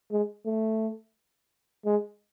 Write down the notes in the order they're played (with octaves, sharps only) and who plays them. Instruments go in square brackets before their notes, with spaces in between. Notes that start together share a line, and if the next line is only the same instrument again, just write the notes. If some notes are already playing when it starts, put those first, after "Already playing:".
[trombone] G#3
A3
G#3